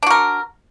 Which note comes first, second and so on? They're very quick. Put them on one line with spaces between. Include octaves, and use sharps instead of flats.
D4 F#4 A#4